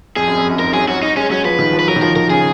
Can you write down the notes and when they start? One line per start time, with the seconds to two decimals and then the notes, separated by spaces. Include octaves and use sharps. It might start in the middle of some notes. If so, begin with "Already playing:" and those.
0.16 F2 G#4
0.28 F#2
0.38 F2
0.49 F#2
0.59 G#2 A#4
0.74 F#3 G#4
0.88 F#3 F#4
1.03 D#4
1.16 G#3 C#4
1.31 F#3 C#4
1.45 F3 B4
1.59 D#3
1.73 F3
1.79 B4
1.88 F#3 A#4
1.96 D#3
2.02 F3 A#4
2.16 D#3 A#4
2.30 C#3 G#4